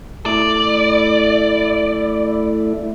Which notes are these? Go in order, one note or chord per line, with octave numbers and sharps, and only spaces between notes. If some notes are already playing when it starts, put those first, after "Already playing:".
A3 E4 D5